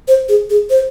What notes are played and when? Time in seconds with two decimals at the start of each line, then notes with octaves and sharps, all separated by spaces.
0.08 C5
0.29 G#4
0.50 G#4
0.70 C5